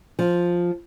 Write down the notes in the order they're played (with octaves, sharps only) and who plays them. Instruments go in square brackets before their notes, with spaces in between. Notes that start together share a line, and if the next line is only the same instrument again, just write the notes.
[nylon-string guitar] F3